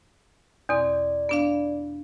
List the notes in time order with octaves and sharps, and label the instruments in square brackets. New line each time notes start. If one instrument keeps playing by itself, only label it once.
[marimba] E2 B2 C4 [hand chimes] D5
[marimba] B3 D4 F5